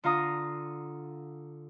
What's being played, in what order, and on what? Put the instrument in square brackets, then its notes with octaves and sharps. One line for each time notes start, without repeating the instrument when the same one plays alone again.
[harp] D3 F4 F5 A#5 D#6